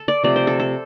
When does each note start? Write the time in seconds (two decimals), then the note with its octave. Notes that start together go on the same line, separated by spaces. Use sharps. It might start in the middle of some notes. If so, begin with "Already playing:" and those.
Already playing: A4
0.08 D5
0.24 C3 F3 A3 D5
0.36 C5
0.47 A4
0.60 A4